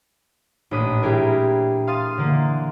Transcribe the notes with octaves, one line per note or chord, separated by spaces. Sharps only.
A1 A#2 D4 B5 D#6
G3 D4 E4 G4 G#4 A#4
F5 C6 D#6 A6
D3 E3 A#3